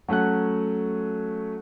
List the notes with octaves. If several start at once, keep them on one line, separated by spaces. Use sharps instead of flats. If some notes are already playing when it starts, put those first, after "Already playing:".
F#3 A3 C#4 F#5 F#6